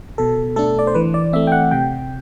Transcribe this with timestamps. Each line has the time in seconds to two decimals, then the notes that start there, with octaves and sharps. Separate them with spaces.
0.18 B2 A4
0.56 A3 D4 A4
0.79 D5
0.87 C5
0.94 E3 B4
1.14 D5
1.33 A3 C4 E5
1.47 G5
1.52 F#5
1.71 C3 G5